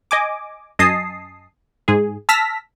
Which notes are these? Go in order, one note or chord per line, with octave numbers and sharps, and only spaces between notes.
D#5 G#5 D6
F#2 D#5 G#5 A5 D#6 C7
G#2 G#4
A5 E6 F6 A#6 B6